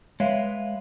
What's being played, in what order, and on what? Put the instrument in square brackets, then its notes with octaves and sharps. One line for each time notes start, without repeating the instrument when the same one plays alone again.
[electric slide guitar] G#3 B4 [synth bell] C#5 E5 F5